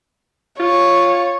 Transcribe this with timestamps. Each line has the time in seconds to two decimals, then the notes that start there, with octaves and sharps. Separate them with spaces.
0.60 F4 C#5